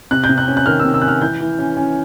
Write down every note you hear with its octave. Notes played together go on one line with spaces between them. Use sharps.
C3 F#6
G6
C3
F#6
C#4
F#6
D#3 F6
E6
C3
E6
C#4 F#6
F6
E3 G6
E3
C#4
C#4